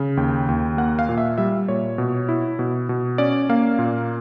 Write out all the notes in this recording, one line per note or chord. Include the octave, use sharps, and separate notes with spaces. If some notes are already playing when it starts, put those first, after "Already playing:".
Already playing: C#3
D#2 G5
D#2
A#3 F#5
F5
A#2
E5
G3 E5
A#2 C#5
B2
E4
B2
B2
C#4 D5
A#3 F5
A#2